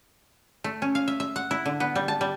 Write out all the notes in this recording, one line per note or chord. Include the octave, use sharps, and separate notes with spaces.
A3
C#4
F5
E5
E5
F#5
E4
D3
B3
G3
A5
G3